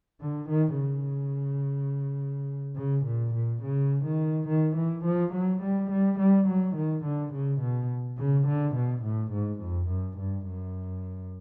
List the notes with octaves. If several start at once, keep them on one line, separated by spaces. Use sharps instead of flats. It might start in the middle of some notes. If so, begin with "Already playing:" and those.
D3
D#3
C#3
C#3
A#2
A#2
C#3
D#3
D#3
E3
F3
F#3
G3
G3
G3
F#3
D#3
D3
C#3
B2
C#3
D3
B2
A2
G#2
F2
F#2
G2
F#2